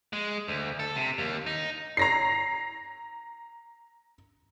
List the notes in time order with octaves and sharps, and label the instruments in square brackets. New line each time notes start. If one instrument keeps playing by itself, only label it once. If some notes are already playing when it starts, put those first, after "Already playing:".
[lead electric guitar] G#3
D2
A4
C3
D#2
D#4
[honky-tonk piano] A#5 A#6 C7